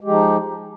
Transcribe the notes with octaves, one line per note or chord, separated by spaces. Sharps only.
F3 G#3 D#4 G4